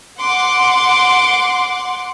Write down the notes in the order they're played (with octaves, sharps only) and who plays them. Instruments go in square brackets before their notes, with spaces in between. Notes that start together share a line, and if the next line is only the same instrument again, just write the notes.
[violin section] F#5 C6 D6